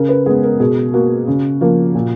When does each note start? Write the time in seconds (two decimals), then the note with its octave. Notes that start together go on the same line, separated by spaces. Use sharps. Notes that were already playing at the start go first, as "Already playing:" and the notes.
Already playing: C#3 A#4
0.09 B4
0.26 G#3 B3 G#4
0.43 A#4
0.60 B2 G#4
0.93 A#3 F#4
1.27 C#3
1.61 F3 A#3
1.95 A#2